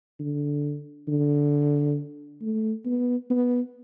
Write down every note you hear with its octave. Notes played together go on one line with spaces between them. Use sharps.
D3
D3
A3
B3
B3